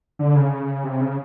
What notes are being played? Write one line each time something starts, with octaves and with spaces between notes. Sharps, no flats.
D3
C#3
C3
C#3